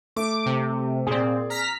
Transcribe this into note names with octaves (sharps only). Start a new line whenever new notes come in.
A3 D6
C3
A#2 C4 G#4 D5
A#5 F6 B6